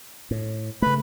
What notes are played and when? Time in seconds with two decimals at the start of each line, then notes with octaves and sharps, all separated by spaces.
0.31 A2
0.82 C#3 A3 B4 B5